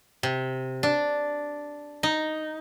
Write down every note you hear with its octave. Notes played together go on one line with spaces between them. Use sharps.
C3
D4
D#4